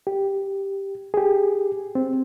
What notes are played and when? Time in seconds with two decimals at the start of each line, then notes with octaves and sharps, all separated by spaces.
0.07 G4
1.14 G4 G#4
1.95 C4